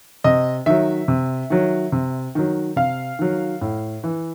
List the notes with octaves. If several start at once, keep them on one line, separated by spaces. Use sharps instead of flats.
C3 D#5
D#3 F#3 E5
C3
D#3 F#3
C3
D#3 F#3
C3 F5
D#3 F#3
A2
E3